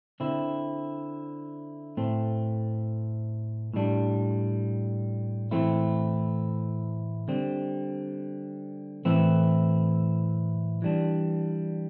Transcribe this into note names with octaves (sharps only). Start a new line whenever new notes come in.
D3 C4 E4
A2 A3 C4
A2 G3 D4
A2 E3 A3 C4 E4
D3 G3 C4
A2 E3 A3 C4 E4
E3 G3 D4